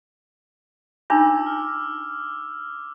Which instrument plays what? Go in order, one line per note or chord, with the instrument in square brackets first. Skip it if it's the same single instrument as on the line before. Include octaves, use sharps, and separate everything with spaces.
[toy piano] D4 D#4 F4 [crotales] D6 E6
[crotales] F6